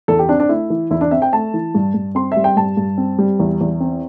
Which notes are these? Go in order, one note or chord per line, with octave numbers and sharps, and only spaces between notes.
E2 A4
G4
C4 D4
D4
A3 E4
E3
E2 E4
D4
C4 E5
G5
A3 A5
E3
G2
G2
C4 C6
G3 E5
G5
G2 A5
G2
C4
G3
E2
E2
C4